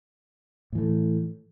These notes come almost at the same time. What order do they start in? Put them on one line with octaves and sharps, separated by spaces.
A2 E3 A3